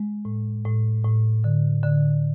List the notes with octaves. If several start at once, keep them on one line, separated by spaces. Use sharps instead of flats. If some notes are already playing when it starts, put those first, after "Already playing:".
Already playing: G#3
A2
A2
A2
D3
D3